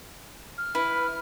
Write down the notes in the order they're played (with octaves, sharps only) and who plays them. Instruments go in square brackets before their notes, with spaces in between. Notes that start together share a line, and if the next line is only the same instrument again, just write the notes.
[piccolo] F6
[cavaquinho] E4 B4